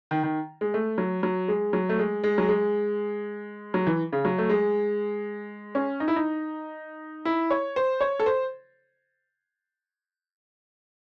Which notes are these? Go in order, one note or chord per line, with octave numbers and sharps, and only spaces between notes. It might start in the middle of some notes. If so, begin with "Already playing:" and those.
D#3
D#3
G#3
A3
F#3
F#3
G#3
F#3
A3
G#3
G#3
F#3
G#3
F#3
E3
C#3
F#3
A3
G#3
C#4
D#4
E4
D#4
E4
C#5
C5
C#5
A4
C5